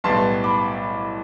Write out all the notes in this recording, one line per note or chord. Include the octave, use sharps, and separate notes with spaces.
B1 A2 E3 G3 B3 A5 C6
B5 D6